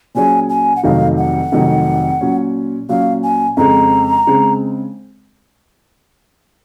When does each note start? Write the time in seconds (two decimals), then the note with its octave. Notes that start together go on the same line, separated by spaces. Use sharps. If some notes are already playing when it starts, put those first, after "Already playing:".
0.15 A#2 F#3 C#4 G#4 C#5 G#5
0.49 G#5
0.76 F#5
0.83 F1 F2 C3 D#3 F#3 F5
1.17 F#5
1.52 F1 F2 C3 D#3 F#3
2.21 A#2 F#3 C#4
2.89 A#2 F#3 C#4 F5
3.23 G#5
3.57 F2 C#3 G#3 C4 A#5
4.27 C#3 G#3 C4